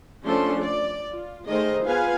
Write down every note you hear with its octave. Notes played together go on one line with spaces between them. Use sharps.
F3 A3 C#4 D4 A4 C6
D5
F4
D#3 A3 G#4 A#4 C5 D#5
B3 F4 G#4 B4 F5 G#5